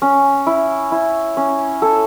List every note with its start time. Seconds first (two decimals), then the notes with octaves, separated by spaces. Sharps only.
0.02 C#4
0.47 E4
0.92 E4
1.37 C#4
1.82 A4